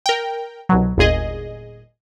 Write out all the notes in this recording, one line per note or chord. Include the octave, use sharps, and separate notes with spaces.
A#4 G5
C2 B2 F#3
G1 D#2 A#2 G#4 D#5